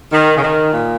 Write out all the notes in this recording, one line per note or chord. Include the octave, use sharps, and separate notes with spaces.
D#3
C#3
D#3
A#2